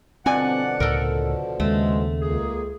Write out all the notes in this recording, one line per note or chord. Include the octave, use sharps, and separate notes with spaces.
G2 B2 D3 F3 C4 D5 F#5 G#5
C#2 A2 A4 A#4
D#2 C#3 G#3 A3
C#2 A#3 G#4